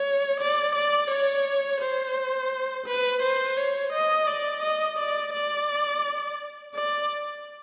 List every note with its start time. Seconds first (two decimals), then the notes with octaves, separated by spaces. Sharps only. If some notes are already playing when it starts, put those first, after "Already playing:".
Already playing: C#5
0.41 D5
0.75 D5
1.11 C#5
1.81 C5
2.86 B4
3.22 C5
3.57 C#5
3.93 D#5
4.27 D5
4.63 D#5
4.99 D5
5.33 D5
6.75 D5